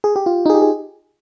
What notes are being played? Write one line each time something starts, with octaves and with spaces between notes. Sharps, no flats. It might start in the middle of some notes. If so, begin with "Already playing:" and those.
G#4
G4
F4
D#4
G#4
G4
G#4